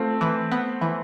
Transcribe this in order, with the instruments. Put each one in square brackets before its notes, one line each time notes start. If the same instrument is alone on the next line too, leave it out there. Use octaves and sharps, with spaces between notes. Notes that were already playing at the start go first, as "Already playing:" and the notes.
Already playing: [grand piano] A3 C4 [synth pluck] F4
[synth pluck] E3
B3
E3